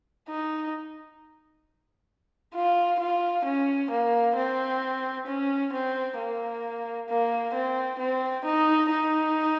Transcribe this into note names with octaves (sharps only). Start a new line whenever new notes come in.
D#4
F4
F4
C#4
A#3
C4
C#4
C4
A#3
A#3
C4
C4
D#4
D#4